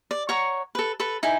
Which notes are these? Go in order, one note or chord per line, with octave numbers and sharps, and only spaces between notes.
D5
C#5 F#5 A#5 C#6
A4 B4
A4 B4 B5
D#4 E4 G5 G#5